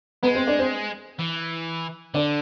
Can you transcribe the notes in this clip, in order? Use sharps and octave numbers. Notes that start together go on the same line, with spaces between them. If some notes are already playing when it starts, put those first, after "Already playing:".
G#3 B3 B4
C4 C5
D4 D5
C4 C5
E3
D3 D4 D5